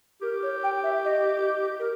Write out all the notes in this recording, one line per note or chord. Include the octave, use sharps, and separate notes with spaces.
G4 A#4
C#5
G5
E5
D#5
A#4